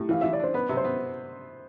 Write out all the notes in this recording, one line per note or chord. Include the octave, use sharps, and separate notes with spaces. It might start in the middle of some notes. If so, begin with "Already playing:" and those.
Already playing: A2 G4
E3 F5
E3 E5
D5
D4 C5
B3 B4
C3
C5
B3